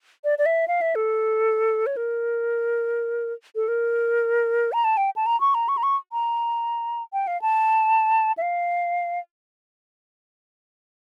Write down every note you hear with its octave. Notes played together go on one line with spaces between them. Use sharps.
D5
D5
E5
F5
E5
A4
C#5
A#4
A4
A#4
A#5
A5
G5
A5
A#5
C#6
A#5
C#6
A#5
C#6
A#5
G5
F5
A5
E5
F5